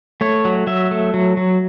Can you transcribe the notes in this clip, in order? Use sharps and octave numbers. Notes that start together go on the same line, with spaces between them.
A3 C#5
F#3
F#3 E5
A3
F#3
F#3